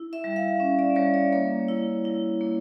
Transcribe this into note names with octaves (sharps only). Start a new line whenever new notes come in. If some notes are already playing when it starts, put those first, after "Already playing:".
Already playing: E4
E5
G3
F5
C#4
D5
G3 C#5
D5
A#3 C#5
E4
E4
A#3